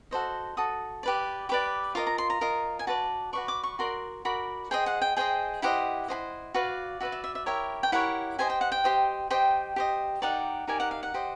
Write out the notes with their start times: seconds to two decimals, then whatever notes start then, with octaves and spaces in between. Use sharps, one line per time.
0.11 F#4 A4 C5 D#5
0.57 F#4 A4 D#6
1.03 G4 B4 D5
1.49 G4 B4 D5 D6
1.95 F4 A#4 D#5 D6
2.07 A#5
2.18 C6
2.30 A#5
2.41 F4 A#4 D#5
2.79 G#5
2.87 F#4 B4 D5 A5
3.33 F#4 B4 D5 C#6
3.48 D6
3.63 C#6
3.79 F#4 A#4 D5 C6
4.25 F#4 A#4 D5 B5
4.71 G#4 C5 D#5 G5
4.86 F#5
5.02 G5
5.17 G#4 C5 D#5 G5
5.62 E4 G4 C5 D#5 F#5
6.08 E4 G4 C5 D#5
6.54 F#4 B4 D5 F5
7.01 F#4 B4 D5 E5
7.12 E5
7.24 E5
7.35 E5
7.46 E4 G4 A#4 C#5 E5
7.83 G5
7.92 E4 G4 A#4 C#5 F#5
8.39 G4 C5 D#5 G#5
8.50 G5
8.61 F#5
8.72 G5
8.84 G4 C5 D#5
9.30 G4 C5 D#5 G5
9.76 G4 C5 D#5
10.22 D#4 G4 A#4 D5 F#5
10.67 D#4 G4 A#4 D5 G#5
10.80 F#5
10.91 F5
11.03 F#5
11.14 G4 C5 D#5